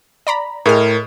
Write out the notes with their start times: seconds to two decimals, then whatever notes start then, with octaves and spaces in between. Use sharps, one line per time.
0.27 D5 A#5 B5
0.66 A2 G#4 A#4 D#5 F6